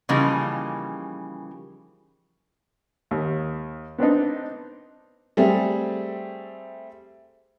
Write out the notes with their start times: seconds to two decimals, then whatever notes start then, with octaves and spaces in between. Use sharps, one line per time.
0.09 C#3 E3 F3 G3 A#3 D#4
3.11 D#2
3.98 B3 C4 D4 D#4
5.37 G3 A3 C4 G#4